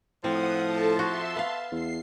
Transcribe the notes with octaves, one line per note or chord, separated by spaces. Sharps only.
A2 F3 C4 F#5 D#6
A4 A5
F#4 E5 A5 C6
B3 F5
E2 C7